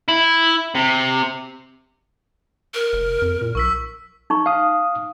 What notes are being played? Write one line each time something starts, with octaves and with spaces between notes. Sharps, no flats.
E4
C3
A#4
F1
F2
A#2
B1 C#6 E6 B6
D#4 C#6
F5 D#6